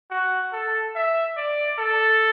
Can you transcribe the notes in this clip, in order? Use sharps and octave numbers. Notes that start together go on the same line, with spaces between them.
F#4
A4
E5
D5
A4